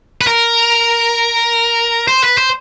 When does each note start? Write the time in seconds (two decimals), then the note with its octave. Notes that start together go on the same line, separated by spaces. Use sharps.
0.21 B4
0.27 A#4
2.08 C5
2.23 B4
2.38 C5